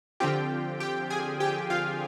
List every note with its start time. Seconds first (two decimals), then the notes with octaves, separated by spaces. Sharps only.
0.20 D3 F3 C4 F4 G4 G5
0.80 G4 G5
1.10 G#4 G#5
1.40 G4 G5
1.70 F4 F5